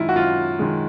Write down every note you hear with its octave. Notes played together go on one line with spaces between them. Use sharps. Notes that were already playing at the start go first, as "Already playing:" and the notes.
Already playing: F#2 D#3 G#3 E4 F4
F#4
F#2 F4
D#3 G#3